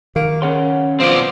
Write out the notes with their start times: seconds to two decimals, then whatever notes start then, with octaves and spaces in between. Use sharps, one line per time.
0.16 D#3 A#3
0.42 C#3 C#4 F#5 C6
1.00 B1 F3 B3 C4 D5 C6